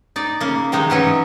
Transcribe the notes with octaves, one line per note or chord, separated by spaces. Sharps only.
D#4 D5
C#3 A#3
C3 D#3 G#3 D#4
E3 F#3 C#4 D#4